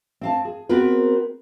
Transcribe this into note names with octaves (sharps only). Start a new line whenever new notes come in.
C4 F5 A5
G#4
B3 C4 F#4 G#4 A#4 B4